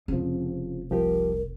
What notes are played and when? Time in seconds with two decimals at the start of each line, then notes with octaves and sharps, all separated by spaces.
0.08 F1 C#3 F3
0.91 C2 F3 G4 A#4